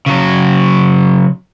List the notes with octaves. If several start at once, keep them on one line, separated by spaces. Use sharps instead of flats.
C#3 F#3